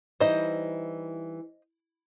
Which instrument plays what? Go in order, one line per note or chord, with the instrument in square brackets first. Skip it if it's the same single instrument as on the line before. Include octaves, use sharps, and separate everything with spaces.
[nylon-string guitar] E3 G3 D#4 [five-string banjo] C5 D#5